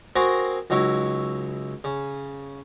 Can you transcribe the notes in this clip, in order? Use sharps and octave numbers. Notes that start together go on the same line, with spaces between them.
C4 F#4 G#4 A#4 C5
C#2 F#3 D#4 E4 C#6
C#3